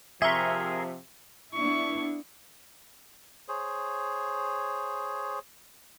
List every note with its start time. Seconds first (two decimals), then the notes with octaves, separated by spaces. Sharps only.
0.22 C3 F3 G#4 A#4 E5 C6 C#6
1.53 B3 D4 E4 C#6
3.48 G#4 C5 C#5